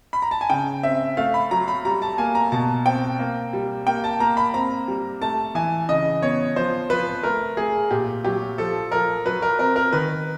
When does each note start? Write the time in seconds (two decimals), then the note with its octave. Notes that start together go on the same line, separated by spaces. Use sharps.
0.13 B5
0.22 A#5
0.31 A5
0.41 G#5
0.50 C#3 G5
0.83 C4 E5
1.17 A3 F5
1.34 B5
1.51 F#3 A#5
1.68 B5
1.85 G3 A#5
2.02 A5
2.18 A#3 G#5
2.35 A#5
2.52 B2 A5
2.86 C4 G5
3.19 A#3
3.53 G3
3.86 A#3 G5
4.04 A5
4.20 A#3 A#5
4.37 B5
4.54 C4 A#5
4.88 G3
5.22 A3 A5
5.55 E3 G#5
5.89 C#3 D#5
6.22 B3 C#5
6.56 F3 C5
6.90 F3 B4
7.23 A3 A#4
7.57 A3 G#4
7.91 A#2 G4
8.24 F#3 G4
8.58 F3 A4
8.92 F3 A#4
9.26 F#3 B4
9.42 A#4
9.59 C4 A#4
9.76 A#4
9.93 D#3 B4